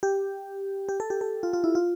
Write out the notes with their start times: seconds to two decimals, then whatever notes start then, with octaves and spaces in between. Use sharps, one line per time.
0.03 G4
0.89 G4
1.00 A4
1.10 G4
1.21 A4
1.43 F4
1.53 F4
1.64 E4
1.75 F4